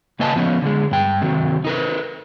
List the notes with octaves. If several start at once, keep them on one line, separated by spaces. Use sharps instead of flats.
C#3 A#3 B4 D#5 G#5 A5
F3 B3 C#4
D3 G#3
G2 G5
C3 D#3 F#3
D#4 A#4 B4